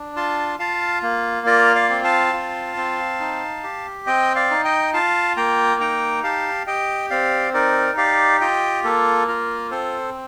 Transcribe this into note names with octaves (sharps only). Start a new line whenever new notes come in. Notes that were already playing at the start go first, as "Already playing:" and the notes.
Already playing: D4
F4 A5 C6
F4 F5 A5
A#3
F4 A#4 D5
D5 F5
C4
F5 A5
F4
C4
D#4
G4
C4 D#5 G5
D5 F5
D#4
D#5 G5
F4 F5 A5
A#3 G5 A#5
D#4 G5 A#5
G4 F5 A5
G4 D#5 G5
C4 D5 F5
D#4 A#4 D5
G4 D5 F5
F4 D#5 G5
A#3 A4
F4 A#4
C4 A4 C5